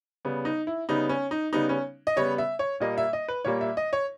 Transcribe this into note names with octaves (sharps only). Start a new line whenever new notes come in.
C#3 G3 B3
D#4
E4
C#3 G3 B3 D#4
C#4
D#4
C#3 G3 B3 D#4
C#4
D#5
C#3 G3 B3 C#5
E5
C#5
A#2 G3 A#3 D#5
E5
D#5
B4
A#2 G3 A#3 C#5
E5
D#5
C#5